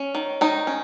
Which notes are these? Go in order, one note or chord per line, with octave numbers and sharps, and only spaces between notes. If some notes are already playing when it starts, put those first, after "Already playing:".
Already playing: C#4
D#3
D#3 D#4
C#4